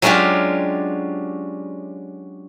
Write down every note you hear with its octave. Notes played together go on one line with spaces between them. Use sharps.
F#3 G#3 C#4 D4 F4 G4